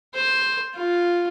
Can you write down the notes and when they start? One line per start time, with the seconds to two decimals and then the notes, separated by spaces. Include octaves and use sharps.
0.14 C5
0.75 F4